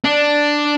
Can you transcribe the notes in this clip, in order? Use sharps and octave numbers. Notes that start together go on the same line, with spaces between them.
D4